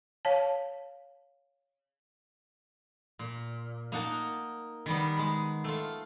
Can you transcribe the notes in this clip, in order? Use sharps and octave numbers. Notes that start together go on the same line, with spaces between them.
C#5 F5 A5
A#2
A#3 D#4 F#5 A5
D#3 G3 B3
G#3 B5
A3 F4